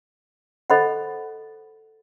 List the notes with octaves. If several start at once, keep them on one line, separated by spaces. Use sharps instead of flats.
A4 C5 D#5 F#5 B5